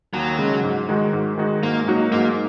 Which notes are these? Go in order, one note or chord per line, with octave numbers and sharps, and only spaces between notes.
D#2 F#3
C#3 G#3
G#2
D#3 G#3 D#4 F#4
G#2
D#3 G#3 D#4 F#4
G#2 A#3
F#3 A#3 D#4 F#4
G#2 A#3